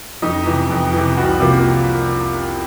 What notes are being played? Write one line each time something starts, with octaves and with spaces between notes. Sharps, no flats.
F2 D#4
C3 E3
F2
C3 E3
C2 F#4
C3 F3 A#3